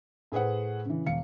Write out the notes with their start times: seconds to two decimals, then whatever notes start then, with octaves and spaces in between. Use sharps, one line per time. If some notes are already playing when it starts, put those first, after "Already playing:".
0.32 A2 G#4 B4 C5 F#5
0.85 C#3 E3
1.06 E1 F5 C#7